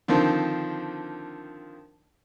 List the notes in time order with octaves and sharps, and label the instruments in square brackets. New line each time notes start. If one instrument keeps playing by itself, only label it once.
[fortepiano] D3 D#3 F3 C4